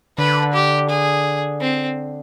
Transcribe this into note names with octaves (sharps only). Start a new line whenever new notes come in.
D3 B4
G4
G#4
C4